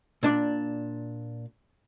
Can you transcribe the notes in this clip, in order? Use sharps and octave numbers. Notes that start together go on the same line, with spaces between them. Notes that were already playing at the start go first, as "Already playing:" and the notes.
A#2 D4 D5